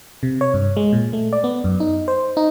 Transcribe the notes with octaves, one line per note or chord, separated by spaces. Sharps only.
C3
C#5
G2
G#3
A#2
A3
D5
B3
F#2
D#4
C5
D#4